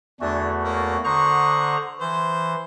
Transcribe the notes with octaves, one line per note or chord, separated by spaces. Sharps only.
E2 D3 A3 D4 F#4 G#5
A#3 C#5
D3 C5 F#5 A#5 C#6 D#6
E3 C5